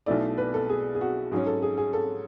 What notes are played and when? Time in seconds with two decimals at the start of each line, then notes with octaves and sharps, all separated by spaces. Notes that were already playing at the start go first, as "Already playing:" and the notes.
0.06 B1 B2 A3 E4 D5
0.38 B4
0.54 A4
0.69 G#4
0.95 G#4
1.01 F#4
1.31 G#2 F#3 C#4 G#4
1.46 A4
1.62 G#4
1.78 G#4
1.93 A4